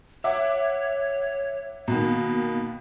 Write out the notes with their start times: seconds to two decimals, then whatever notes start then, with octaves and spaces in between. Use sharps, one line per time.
0.24 C#5 E5 F#5 D6
1.88 B2 D#3 A#3